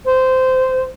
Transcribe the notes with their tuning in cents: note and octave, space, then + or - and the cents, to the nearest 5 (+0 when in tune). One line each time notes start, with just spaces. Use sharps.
C5 -15